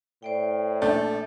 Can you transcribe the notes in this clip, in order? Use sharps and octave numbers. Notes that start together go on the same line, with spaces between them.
A2 C5 D5 G5
A#1 A3 D4 G6